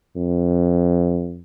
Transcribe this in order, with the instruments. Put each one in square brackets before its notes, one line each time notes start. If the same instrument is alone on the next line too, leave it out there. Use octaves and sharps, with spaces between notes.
[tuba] F2